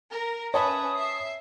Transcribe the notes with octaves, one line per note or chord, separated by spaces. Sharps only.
A#4
C#4 B4 C#5 E5 A5 B5 D#6
E5 C7